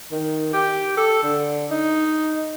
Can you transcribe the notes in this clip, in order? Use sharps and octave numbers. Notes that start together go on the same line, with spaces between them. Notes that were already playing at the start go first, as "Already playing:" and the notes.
D#3
G4
A4
D3
D#4